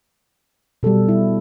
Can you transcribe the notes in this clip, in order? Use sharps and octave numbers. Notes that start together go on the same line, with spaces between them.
B2 G3 A4
E4